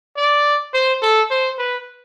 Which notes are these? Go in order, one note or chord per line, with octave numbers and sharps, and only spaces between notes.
D5
C5
A4
C5
B4